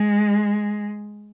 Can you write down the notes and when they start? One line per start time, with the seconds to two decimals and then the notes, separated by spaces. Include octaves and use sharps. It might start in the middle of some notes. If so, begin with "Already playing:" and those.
Already playing: G#3